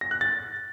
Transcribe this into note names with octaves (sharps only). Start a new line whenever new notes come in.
A#6
F#6
A6